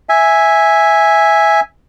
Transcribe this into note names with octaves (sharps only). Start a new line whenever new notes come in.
E5 G#5